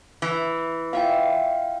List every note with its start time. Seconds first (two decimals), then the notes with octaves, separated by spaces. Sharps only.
0.22 E3
0.93 F4 E5 F5 G5